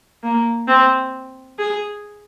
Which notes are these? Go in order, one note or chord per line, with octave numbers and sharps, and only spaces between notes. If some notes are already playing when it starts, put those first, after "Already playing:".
A#3
C4
G#4